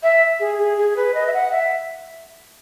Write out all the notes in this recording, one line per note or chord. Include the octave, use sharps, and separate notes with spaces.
E5
G#4
G#4
G#4
B4
D#5
E5
F#5
E5